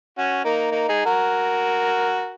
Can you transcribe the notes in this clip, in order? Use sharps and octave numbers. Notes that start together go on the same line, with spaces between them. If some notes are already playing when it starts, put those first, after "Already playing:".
C#4 F#4
A#3 D#4
A#3 D#4
D#4 G#4
F#4 A#4